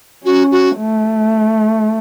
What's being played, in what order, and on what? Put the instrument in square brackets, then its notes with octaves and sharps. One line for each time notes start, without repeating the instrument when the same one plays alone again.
[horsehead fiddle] C#4 [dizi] F#4
[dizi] F#4
[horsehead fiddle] A3